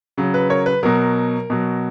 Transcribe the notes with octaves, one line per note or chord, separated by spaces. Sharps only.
C#3 F#3
B4
A#4 C#5
B4
B2 F#3 A#4
B2 F#3